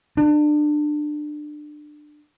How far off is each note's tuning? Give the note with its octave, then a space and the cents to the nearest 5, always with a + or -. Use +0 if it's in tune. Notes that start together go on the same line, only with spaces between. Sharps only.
D4 +25